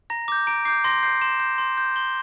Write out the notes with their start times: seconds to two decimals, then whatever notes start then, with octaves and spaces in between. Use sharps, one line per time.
0.10 A#5 A#6
0.28 D6 G6
0.47 A#5 D7
0.65 D6 G6 C7
0.84 C6 A#6
1.03 G6 C7
1.21 C6 E7
1.40 G6
1.58 C6
1.78 G6
1.96 C6 G7